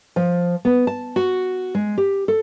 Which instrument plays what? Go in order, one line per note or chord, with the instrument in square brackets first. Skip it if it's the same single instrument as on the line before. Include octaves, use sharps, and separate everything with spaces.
[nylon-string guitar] F3
B3
A5
F#4
G#3
G4
A4